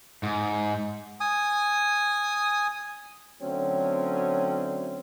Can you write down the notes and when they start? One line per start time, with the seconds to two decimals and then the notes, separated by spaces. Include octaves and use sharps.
0.23 G#2
1.21 G#5 D#6
3.42 D3 F#3 A3 C4 C#4